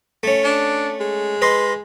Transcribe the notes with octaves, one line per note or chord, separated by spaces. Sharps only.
A3 C#4
D4
G#3
B4 D#5 C6